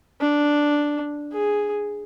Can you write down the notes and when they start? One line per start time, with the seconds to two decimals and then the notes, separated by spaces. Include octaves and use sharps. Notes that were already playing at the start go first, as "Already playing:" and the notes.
0.21 D4
1.32 G#4